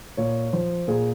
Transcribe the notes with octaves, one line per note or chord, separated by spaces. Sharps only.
A#2 C#5
F3 C5
A#2 G#4